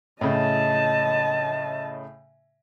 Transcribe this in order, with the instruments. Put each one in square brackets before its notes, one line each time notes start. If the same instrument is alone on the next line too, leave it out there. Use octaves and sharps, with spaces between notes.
[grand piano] A2 C#3 [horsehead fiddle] D#5 A5